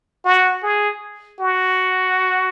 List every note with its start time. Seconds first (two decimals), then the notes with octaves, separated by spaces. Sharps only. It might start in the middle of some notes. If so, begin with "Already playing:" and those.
0.25 F#4
0.63 G#4
1.40 F#4